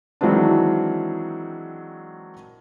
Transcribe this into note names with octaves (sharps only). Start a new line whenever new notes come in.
D#3 E3 F#3 G#3 C4 D4